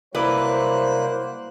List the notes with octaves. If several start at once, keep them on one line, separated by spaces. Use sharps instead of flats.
C2 F#3 A#3 E4 B4 C5 D5 F#6